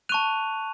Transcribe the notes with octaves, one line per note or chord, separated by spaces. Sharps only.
A5 C#6 F#6 D#7 F7